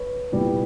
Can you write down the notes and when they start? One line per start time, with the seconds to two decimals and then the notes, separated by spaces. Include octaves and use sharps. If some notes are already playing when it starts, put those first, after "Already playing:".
Already playing: B4 C#5
0.32 C2 A#2 G3 B3